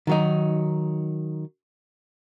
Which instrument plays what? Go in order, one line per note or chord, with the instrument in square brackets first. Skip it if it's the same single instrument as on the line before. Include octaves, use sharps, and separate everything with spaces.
[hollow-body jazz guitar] D#3 F#3 D#4